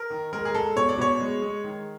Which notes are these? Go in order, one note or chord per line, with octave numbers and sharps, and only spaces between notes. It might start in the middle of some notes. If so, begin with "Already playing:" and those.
Already playing: A#4
D#3
G#3 A#4
G#4
G#3 A4
B2 C#5
D5
B2 C#5
G#3
G#3
D#3